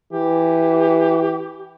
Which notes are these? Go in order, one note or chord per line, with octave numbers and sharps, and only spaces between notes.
E3 G4